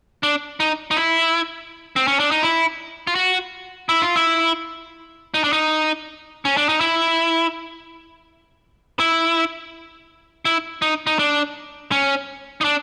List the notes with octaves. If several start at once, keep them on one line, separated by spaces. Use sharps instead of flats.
D4
D#4
D#4
E4
C4
C#4
D4
D#4
E4
F4
F#4
E4
F4
E4
D#4
D4
D#4
C#4
D4
D#4
E4
E4
E4
D#4
D#4
D4
C#4
D#4
D4